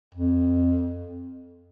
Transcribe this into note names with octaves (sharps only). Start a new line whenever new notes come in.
F2